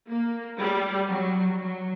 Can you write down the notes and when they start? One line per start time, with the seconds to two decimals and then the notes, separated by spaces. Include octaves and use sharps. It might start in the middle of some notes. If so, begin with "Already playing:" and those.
0.09 A#3
0.59 G3
1.08 F#3
1.58 F#3